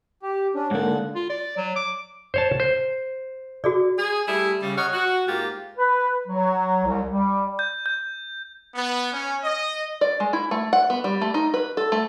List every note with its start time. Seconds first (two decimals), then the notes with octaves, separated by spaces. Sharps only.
0.23 G4
0.54 C#4 D4
0.71 G#2 D3 A#3 F#5
1.15 F4
1.30 D5
1.57 F#3
1.76 D6
2.34 C5 C#5 A5
2.60 C5
3.64 F#4 G#4 D5
3.99 G#4
4.27 G3 A3 E4 G4 G#4
4.62 C#3 G3
4.78 C#5 D#5 F5 F#5
4.93 F#4
5.28 G#2 A#3 F4 G4
5.78 B4
6.28 F#3
6.85 C2
7.10 G3
7.59 G6
7.86 G6
8.75 B3
9.13 C#4
9.44 D#5
10.01 D5
10.20 G#3
10.33 E4
10.51 A3
10.73 F#5
10.90 B3
11.04 G3
11.22 A3
11.34 D#4
11.54 B4
11.77 A4
11.92 A3